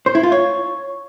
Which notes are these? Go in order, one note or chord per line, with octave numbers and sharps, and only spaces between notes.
C5
E4
F4
C#5